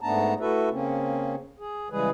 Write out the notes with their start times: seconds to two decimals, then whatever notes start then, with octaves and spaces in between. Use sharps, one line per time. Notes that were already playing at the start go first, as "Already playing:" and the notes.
0.01 G#2 A3 B3 D4 A5 A#5
0.40 A3 E4 F#4 A4 B4 E5
0.71 C#3 A#3 C4 C#4
1.59 G#4
1.90 C#3 E3 G3 G#3 G#4 B4